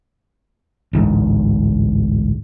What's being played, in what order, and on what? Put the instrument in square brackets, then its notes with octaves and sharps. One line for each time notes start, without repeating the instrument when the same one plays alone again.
[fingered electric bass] A1 D2 G#2